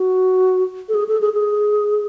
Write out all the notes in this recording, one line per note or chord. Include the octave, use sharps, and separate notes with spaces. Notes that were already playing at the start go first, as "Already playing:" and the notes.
Already playing: F#4
A4
G#4
A4
G#4
G#4